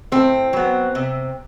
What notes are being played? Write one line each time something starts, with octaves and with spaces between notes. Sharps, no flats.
A2 C4
F#3 B3
C3